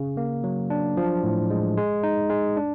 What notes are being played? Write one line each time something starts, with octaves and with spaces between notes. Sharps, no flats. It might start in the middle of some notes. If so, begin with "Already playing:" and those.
Already playing: C#3
A#3
F#3
D4
F3
A2
G#3
G#3
D#4
G#3
D4